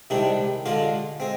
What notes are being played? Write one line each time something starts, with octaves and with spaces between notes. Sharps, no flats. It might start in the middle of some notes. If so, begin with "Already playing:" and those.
C2 C3 D#3 G#3 D4
D3 G#3 D4 F4
G#3 C4